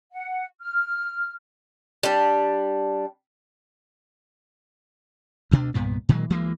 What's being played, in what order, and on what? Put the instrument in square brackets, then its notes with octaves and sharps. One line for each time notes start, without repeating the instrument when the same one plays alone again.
[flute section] F#5
F6
[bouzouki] G3 D4
[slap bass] D2 B2 D4
C2 G2 A#2 B3
A#2 D#3 F#3 G#3
D2 E3 G#3 A#3